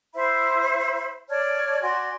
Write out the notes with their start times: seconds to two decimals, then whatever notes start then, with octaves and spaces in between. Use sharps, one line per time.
0.13 E4 C5 E5 B5
1.29 C#5 D5 A5 F6
1.82 F#4 D5 G#5 C6